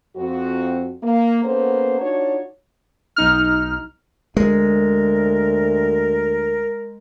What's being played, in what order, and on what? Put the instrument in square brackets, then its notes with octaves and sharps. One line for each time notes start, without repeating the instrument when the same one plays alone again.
[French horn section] F2 C4 F#4
A#3
A#3 B3 C#4 A4 C5
D4 D#4 F4 F#4 C#5
[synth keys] B1 D#4 F6
[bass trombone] D2 [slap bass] G#3 [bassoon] A#4